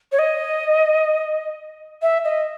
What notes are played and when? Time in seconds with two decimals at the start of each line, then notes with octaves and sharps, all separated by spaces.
0.12 C#5
0.18 D#5
2.02 E5
2.24 D#5